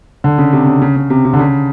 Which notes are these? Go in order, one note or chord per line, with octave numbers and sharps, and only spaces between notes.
D3
C#3
C3
C#3
C#3
C#3
C3
C3
D3
C#3